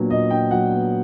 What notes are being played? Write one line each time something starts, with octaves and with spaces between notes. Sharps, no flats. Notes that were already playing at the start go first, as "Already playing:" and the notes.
Already playing: A#2 F#3 B3 D4
A#2 D#5
D4 G5
F#3 F#5
B3